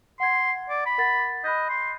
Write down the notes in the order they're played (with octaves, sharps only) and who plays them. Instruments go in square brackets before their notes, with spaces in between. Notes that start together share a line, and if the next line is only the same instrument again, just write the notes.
[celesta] F#5 G#6 [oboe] C6
[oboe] D5
B5
[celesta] A#4 F#5 A6
[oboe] D#5 [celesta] B5 F#6 G6
[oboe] C6